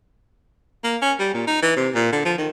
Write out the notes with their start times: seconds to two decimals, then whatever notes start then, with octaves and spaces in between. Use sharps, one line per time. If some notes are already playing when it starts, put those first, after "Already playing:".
0.84 A#3
1.02 C#4
1.19 G3
1.34 A#2
1.47 D#4
1.62 E3
1.77 C3
1.95 A#2
2.13 D3
2.25 F3
2.38 D#3